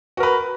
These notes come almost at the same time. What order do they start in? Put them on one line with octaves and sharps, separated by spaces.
F#4 A#4 B4